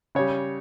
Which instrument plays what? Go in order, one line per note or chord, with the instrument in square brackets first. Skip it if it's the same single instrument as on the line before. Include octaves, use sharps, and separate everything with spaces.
[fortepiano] C#3 G3 C#5